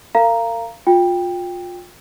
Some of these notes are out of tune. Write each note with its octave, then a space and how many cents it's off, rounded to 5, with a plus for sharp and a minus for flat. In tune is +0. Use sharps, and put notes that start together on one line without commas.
A#4 -40 F5 -25 A#5 +0
F4 +25 G5 +15